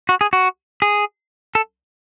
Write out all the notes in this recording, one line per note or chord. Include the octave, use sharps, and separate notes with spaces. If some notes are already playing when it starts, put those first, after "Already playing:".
F#4
G#4
F#4
G#4
A4